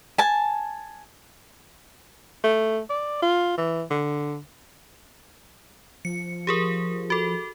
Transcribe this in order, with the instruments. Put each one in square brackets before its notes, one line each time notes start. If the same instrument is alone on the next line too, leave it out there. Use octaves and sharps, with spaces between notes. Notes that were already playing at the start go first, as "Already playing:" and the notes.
[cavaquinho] G#5 A5
[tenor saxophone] A3
D5
F4
E3
D3
[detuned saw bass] F3 [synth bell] C#7
[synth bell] G4 G#4 A#4
F#4 A4